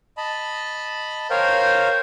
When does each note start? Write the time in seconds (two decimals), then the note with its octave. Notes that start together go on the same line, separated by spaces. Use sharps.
0.17 D#5 A5 B5
1.30 A#4 C5 C#5 F5 G5